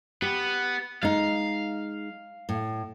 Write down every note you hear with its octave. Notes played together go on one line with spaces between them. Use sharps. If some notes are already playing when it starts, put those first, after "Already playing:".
B3 G4
G#3 D#4 F5
A2